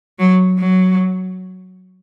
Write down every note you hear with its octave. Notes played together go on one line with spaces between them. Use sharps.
F#3
F#3